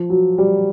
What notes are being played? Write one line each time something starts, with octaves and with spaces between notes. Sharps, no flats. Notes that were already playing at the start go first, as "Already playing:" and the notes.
Already playing: F3
F#3
G3